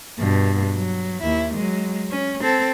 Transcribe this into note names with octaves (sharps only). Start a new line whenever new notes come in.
G2 B2
F#3
D#2 E4
F#3 G#3
C#4
C4 A4